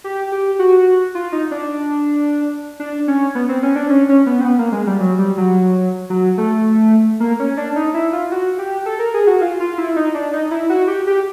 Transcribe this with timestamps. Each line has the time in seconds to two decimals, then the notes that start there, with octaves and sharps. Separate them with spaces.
0.04 G4
0.32 G4
0.59 F#4
1.15 F4
1.32 D#4
1.51 D4
2.80 D4
3.08 C#4
3.35 B3
3.49 C4
3.63 C#4
3.76 D4
3.90 C#4
4.09 C#4
4.26 B3
4.41 C4
4.45 B3
4.59 A#3
4.72 G#3
4.86 G3
5.00 F#3
5.19 G3
5.37 F#3
6.10 F#3
6.38 A3
7.20 A#3
7.40 C#4
7.57 D4
7.76 D#4
7.94 E4
8.12 F4
8.31 F#4
8.58 G4
8.86 A4
8.99 A#4
9.14 G#4
9.27 F#4
9.41 F4
9.60 F4
9.78 E4
9.96 D#4
10.14 D4
10.33 D#4
10.51 E4
10.70 F#4
10.87 G4
11.07 G4